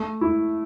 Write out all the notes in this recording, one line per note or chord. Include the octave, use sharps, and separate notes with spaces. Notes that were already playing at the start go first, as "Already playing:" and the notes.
Already playing: A3
E4